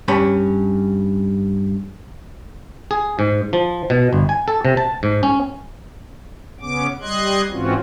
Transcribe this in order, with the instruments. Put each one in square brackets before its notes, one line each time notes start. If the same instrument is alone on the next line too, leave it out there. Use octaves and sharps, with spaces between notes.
[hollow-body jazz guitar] G2 C#4 B5
[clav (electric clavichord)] G#4
G#2
F3
B2
G1
G#5
A4
C3
A5
G#2
C#4
[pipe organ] C#3 B3 C#4 D6
G3 D#5 C6 F#6 G#6
G#2 E3 C4 C#4 F4 F#4